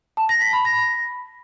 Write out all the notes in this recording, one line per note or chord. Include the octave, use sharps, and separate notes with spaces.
A5
A#6
B6
B5
A#6